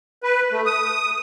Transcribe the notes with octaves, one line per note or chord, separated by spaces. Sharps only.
B4
A3
D#6